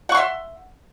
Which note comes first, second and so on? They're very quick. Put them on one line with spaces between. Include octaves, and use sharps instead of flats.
F#5 C#6 C6 E5